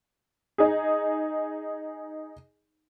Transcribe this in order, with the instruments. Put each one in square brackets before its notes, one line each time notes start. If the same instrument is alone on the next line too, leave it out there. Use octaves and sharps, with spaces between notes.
[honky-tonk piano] D#4 G#4